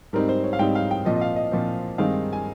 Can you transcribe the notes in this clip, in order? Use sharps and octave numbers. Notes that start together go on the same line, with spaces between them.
G#2 G3 C4 D#4 A#4
C5
C#5
F5
G#2 G3 C4 D#4 G5
F5
G5
A#2 F3 C4 D#5
D#5
F5
D#5
A#2 F3 C4
G2 D#3 G#3 C4 D#4 F5
G#5